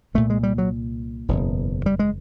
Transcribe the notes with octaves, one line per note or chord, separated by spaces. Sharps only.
C2 A#2 A3
G#3
G3
F#3
F#1 E2 B2
G3
G#3